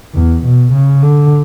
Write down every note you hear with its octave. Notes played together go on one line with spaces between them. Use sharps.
E2
B2
C#3
D3